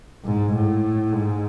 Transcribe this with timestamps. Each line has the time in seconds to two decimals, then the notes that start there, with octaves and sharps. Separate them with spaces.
0.25 G#2
0.54 A2
1.13 G#2